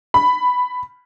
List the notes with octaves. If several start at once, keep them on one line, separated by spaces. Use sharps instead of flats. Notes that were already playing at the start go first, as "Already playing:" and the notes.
B5